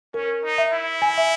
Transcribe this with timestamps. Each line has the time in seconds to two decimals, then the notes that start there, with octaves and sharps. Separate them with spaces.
0.14 C#4 A#4
0.44 D#4
0.58 E5
0.73 E4
1.02 G#5
1.18 E5